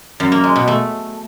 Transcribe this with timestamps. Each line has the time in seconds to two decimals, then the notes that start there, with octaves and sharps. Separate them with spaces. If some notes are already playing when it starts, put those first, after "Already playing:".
0.20 F#2
0.32 A#3
0.44 G#3
0.56 B2
0.68 A3